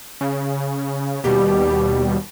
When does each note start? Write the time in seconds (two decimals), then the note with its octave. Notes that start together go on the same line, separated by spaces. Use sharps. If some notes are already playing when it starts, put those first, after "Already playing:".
0.21 C#3
1.24 D#2 B2 G3 G4